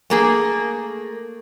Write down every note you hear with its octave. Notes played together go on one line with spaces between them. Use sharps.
A3 A#3 G#4